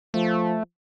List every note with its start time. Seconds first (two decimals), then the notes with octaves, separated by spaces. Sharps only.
0.14 F3 A3